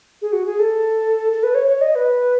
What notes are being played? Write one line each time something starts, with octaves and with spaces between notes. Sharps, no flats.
G#4
F#4
G#4
A4
A4
B4
C#5
C#5
D#5
B4